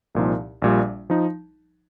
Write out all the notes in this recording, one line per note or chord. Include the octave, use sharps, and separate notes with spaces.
C2 A#2 F3 D#4
A#1 A#2 G3
F3 D#4